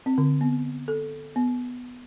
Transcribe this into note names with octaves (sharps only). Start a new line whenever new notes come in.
C4
D3
B3
A4
B3